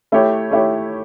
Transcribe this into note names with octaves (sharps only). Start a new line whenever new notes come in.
A3 E4 G4 C#5
A3 E4 G4 C#5